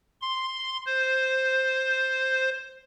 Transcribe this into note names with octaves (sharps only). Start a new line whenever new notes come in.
C6
C5